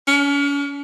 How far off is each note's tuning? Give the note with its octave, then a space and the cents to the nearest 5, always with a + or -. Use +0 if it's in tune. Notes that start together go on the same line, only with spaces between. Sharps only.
C#4 +40